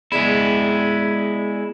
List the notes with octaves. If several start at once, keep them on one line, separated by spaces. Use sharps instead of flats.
G#3 B3 E4 G#4 D5